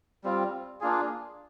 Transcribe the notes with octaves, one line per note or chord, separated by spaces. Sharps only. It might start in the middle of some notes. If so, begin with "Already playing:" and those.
G3 C4 F4
A#3 D4 F4 G#4